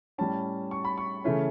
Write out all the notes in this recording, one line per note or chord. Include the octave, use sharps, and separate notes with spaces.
A2 G3 C#4 A5
C#6
B5
C#6
C#3 E3 A3 C#4